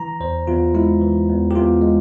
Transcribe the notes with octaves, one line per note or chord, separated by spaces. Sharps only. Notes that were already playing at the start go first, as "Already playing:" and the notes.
Already playing: E3 A#5
E2 C5
E2 F4
G#3 E4
E3
E2
G4
E2 F4
G#3